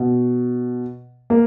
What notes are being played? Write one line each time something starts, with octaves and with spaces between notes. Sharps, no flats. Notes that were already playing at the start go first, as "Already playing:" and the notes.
Already playing: B2
A#3